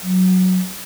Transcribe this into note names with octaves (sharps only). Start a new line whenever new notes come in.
F#3